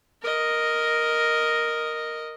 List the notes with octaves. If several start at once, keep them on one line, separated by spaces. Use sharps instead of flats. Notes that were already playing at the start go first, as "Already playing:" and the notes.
A#4 D#5